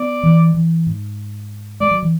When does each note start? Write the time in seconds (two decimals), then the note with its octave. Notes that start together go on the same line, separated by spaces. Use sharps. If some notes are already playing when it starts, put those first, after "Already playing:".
Already playing: B3 D5
0.23 E3
0.54 E3
0.87 G#2
1.80 G#3 D5
1.91 F#3
2.02 E3